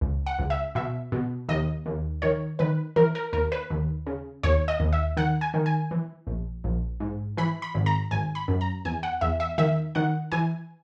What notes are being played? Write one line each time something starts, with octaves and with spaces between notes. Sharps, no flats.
C#2
F#5
C#2
E5
B2 E5
B2
D#2 D#5
D#2
D#3 C#5
D#3 B4
E3 A#4
A#4
D#2 A#4
B4
D#2
C#3
D#2 C#5
D#5
D#2
E5
D#3 F#5
G#5
D#3
G#5
E3
A#1
A#1
G#2
E3 B5
B5
G#1
A#5
G#1 G#5
B5
F#2
A#5
E2 G#5
F#5
E2 E5
E5
D#3 E5
D#3 F#5
E3 G#5